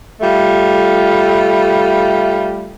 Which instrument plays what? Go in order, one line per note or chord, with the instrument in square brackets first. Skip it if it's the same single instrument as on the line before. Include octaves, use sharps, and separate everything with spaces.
[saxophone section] G3 A3 F4